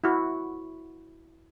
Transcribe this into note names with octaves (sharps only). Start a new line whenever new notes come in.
E4 F#4